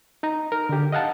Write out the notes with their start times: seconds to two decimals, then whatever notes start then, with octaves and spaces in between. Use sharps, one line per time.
0.23 D#4 A#5
0.52 A#4
0.69 D3 G4
0.92 D#5 F5 F#5 A5